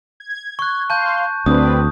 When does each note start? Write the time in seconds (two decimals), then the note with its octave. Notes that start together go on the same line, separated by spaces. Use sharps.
0.20 G#6
0.59 C#6 F#6
0.90 F5 A5 C6 G6
1.46 D2 C4 D4 B4 D#6